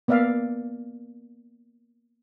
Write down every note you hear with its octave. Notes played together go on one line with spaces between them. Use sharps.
A#3 B3 D5 E5 F5